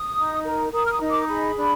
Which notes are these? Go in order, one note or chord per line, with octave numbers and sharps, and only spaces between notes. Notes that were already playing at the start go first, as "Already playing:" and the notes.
Already playing: D#6
D#4
A#4
A#4 D#6
F6
D#6
D#4
D6
G#4 B5
D4